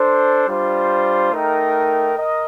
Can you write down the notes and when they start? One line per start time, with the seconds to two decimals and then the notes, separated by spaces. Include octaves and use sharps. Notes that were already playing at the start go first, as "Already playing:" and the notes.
Already playing: D4 A4 C5
0.47 G3 D4 F4 C5
1.32 A3 D#4 A#4 D#5 G5
2.17 A#4 D#5